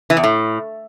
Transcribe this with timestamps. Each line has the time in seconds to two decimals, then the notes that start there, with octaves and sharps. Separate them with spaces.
0.10 E3
0.17 E2
0.24 A2